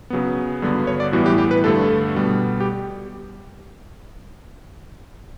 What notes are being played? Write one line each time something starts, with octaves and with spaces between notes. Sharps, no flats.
C#3 F#3 B3
G2 D3 F#3 B3
C#5
D5
A2 E3 G3 B3 F#4
G4
G4
B4
G2 D3 A3 A4
B2 G3 B3
G4